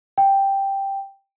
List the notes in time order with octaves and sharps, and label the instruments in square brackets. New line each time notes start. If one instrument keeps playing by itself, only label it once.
[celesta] G5